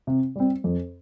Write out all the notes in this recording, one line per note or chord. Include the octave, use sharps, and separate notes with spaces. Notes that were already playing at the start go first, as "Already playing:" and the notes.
C3
G3 C4
F2